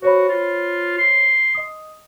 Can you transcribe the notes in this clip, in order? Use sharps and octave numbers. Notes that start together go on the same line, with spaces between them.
F#4 C5 C#5 B5
F4
C6
D#5 D#6